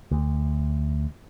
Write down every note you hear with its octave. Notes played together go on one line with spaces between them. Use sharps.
D2